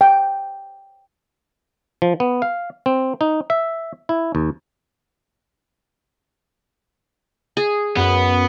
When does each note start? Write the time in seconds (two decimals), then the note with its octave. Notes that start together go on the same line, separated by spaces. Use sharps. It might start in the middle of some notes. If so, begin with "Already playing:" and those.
0.01 G5
2.02 F3
2.20 B3
2.42 F5
2.86 C4
3.21 D#4
3.50 E5
4.09 E4
4.35 D#2
7.57 G#4
7.97 F#2 B3